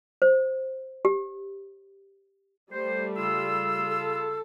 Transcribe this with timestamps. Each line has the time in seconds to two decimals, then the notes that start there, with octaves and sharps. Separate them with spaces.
0.22 C5
1.05 G4
2.71 G3 A3 C5
3.16 C#3 F4 E6
3.90 A4